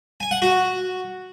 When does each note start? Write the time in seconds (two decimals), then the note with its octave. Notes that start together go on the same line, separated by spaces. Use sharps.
0.20 G#5
0.31 F#5
0.42 F#4